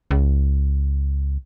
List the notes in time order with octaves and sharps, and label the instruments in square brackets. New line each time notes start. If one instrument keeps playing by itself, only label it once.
[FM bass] C#2